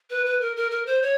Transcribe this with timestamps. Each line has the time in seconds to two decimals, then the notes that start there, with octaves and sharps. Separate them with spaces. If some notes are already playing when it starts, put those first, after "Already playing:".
0.10 B4
0.26 B4
0.41 A#4
0.57 A#4
0.71 A#4
0.86 C5
1.02 C#5